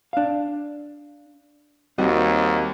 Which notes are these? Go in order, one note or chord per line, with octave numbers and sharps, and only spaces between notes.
D4 F5
D#2 G3 C4 F#4 D#5